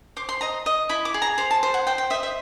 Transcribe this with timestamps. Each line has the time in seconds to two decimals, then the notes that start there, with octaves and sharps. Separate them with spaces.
0.17 C5 D6
0.29 C6
0.41 D#5 A#5
0.66 D#5
0.89 E4 B5
1.05 D6
1.14 G#4
1.22 A#5
1.38 C5 A#5
1.51 A5
1.63 C5
1.74 F#5
1.87 C5 G5
1.98 G5
2.10 D#5 E5
2.23 E5